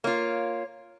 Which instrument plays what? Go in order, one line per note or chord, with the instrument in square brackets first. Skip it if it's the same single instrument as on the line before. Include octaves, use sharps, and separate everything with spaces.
[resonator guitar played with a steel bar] A#3 F4 [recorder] C#5